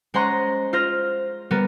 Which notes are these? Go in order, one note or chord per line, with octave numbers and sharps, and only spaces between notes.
G#3 C#4 C5 F#5 A#5 C6
F4 C5 F6 A#6
G3 B3 A#4 D#7